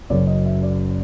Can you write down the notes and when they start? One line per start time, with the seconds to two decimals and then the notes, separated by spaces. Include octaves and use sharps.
0.10 F#1 F#2 C#3 F#3 D5
0.27 D#5
0.46 E5
0.63 D5